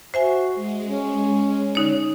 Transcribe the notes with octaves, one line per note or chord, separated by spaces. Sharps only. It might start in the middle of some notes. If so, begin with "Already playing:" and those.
F#4 C5 E5 G#5
G#3
C#4
D3 D#4 C#5